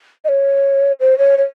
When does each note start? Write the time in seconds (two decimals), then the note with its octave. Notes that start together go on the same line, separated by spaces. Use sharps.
0.24 D#5
0.29 C#5
1.00 C5
1.18 C#5
1.37 C#5